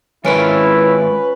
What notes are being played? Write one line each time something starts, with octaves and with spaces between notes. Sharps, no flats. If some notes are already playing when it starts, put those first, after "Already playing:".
D#3 G#3 C#4 E4 F4 A#4 B4